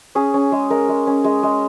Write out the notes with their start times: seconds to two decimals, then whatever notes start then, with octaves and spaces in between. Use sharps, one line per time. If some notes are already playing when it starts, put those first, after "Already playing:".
0.15 C#4 G#4
0.34 C#4
0.52 G#3
0.70 G#3 A#4
0.89 G#3
1.07 C#4
1.24 G#3
1.43 G#3